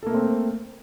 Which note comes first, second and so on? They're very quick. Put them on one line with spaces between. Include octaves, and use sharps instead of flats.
A4 A#3 A3 C4